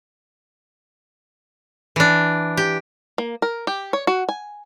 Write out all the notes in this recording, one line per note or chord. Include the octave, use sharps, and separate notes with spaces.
E3 D4
G4
A#3
A#4
G4
C#5
F#4
G#5